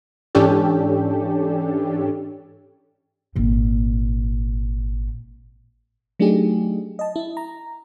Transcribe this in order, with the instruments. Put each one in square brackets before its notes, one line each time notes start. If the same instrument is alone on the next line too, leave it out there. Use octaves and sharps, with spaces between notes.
[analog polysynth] G#2 E3 C#4 D4 G4 A4
[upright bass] G#1 A#2
[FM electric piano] F#3 A3 D4 D#4 G4 G#4
D#5 A5
E4
A#5